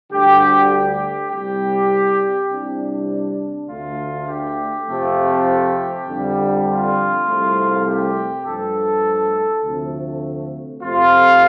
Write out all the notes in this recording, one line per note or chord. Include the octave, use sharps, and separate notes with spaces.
D2 D3 G3 G4
G4
C2 C3 G3 G4
C2 C3 G3 D4
D2 D3 A3 F4
G4
F2 C3 F3 A3
F2 D3 G3
F4
C2 C3 F3 A3
G4
G2 F3 A3 A4
D2 C3 F3 A3
F2 C3 F3 A3 F4